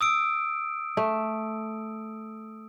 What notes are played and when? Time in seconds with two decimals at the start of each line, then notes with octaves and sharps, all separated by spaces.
0.01 D#6 E6 D7
0.97 A3